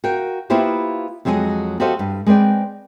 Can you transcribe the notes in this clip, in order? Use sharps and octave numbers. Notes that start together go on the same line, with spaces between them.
F#4 A#4 F5 G5
A#3 B3 E4 F4 G4 C5
F2 F#3 G#3 G4 G#4 D#5
F#4 G4 A4 C5 D#5 F5
G2
G#3 C4 B4 D5 G5